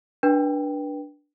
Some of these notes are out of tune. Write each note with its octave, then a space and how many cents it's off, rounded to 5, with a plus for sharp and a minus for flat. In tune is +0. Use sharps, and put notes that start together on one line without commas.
D4 +0 B4 -25 G5 +0